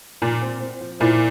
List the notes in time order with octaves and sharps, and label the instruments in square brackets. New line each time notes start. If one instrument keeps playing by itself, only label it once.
[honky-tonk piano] A#2 [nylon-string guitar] F4
[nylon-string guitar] C4
C4
F3
[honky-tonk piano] A#2 [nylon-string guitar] E4